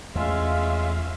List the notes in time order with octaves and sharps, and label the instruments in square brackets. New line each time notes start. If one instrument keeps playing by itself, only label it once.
[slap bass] E2 A3 [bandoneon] G#3 F4 [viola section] C#4 E5 F5